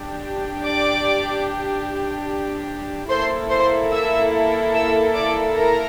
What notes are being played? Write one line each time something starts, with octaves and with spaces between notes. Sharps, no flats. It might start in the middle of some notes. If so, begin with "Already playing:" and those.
Already playing: D4 G4
D5 D6
A#3 E4 A4 C5 C6
C5 C6
E5 E6
E5 E6
D5 D6
A#4 A#5